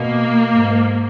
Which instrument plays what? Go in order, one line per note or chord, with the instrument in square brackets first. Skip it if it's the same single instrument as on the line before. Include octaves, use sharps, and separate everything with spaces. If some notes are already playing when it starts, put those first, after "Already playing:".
Already playing: [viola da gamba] B2 [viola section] A#3
[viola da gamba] G#2